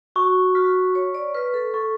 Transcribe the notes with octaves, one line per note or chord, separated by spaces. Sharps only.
F#4 C#6
F#4 F6 B6
C#5 C#6
D5
B4 F6 B6
A4
A4 C#6